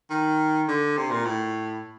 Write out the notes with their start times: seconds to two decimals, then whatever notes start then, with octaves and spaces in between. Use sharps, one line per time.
0.10 D#3
0.68 D3
0.97 C3
1.11 A#2
1.25 A2